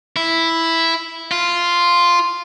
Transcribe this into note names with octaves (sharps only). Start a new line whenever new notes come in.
E4
F4